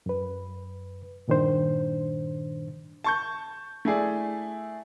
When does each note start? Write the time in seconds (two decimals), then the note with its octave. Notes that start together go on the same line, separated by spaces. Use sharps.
0.06 F#2 B4
1.28 G2 A#2 D#3 D4 C5
3.04 A5 C#6 G6
3.85 A3 E4 G#4 D5